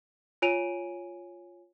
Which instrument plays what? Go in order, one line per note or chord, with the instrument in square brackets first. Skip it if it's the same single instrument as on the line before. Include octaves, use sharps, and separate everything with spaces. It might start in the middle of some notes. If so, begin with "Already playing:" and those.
[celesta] F4 C#5 G#5 D7 D#7 F7